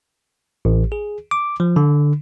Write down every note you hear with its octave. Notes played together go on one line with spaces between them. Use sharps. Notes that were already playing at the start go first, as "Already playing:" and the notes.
A1
G#4
D6
F3
D3